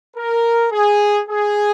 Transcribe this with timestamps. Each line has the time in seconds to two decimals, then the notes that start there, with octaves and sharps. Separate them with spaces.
0.17 A#4
0.72 G#4
1.28 G#4